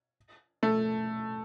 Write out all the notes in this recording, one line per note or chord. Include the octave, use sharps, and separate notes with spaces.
A3